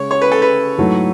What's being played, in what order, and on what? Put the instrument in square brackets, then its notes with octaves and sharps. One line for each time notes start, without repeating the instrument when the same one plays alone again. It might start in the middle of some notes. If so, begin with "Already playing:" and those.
Already playing: [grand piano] C#3 G#3 [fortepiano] C#5
[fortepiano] C#5
B4
A4
B4
[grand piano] G#2 F#3 A3 E4